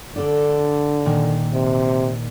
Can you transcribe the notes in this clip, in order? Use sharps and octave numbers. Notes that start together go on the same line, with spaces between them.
D3 D4 A4 D5
A#2 D#3
C3